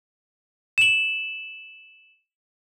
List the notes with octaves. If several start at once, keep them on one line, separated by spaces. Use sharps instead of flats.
E7 F#7